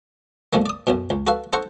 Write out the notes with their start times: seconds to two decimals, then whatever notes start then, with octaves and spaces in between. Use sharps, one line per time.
0.53 B1 G#2 D3 A3 A#3
0.66 D5 D#6
0.87 B1 F#2 B2
1.10 C#2
1.27 F#4 A4 B4 F5
1.53 D#4 A4 C5 F#5 A#5 C#6